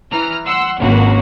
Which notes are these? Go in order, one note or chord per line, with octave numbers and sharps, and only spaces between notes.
E3 A#5 F6
F#5 C6 E6
G#1 C#2 A#3 F#4